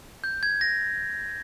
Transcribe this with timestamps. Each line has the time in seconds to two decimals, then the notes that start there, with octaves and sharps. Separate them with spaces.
0.24 G6
0.43 G#6
0.61 A#6